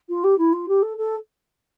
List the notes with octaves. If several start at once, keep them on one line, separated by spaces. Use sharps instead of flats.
F4
G4
E4
F4
G4
A4
A4